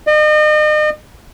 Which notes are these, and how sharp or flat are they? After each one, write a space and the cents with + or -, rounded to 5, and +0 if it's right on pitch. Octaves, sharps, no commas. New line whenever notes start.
D#5 -40